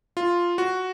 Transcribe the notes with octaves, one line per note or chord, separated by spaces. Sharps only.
F4
F#4